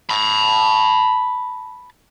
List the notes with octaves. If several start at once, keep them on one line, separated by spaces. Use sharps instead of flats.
A5 B5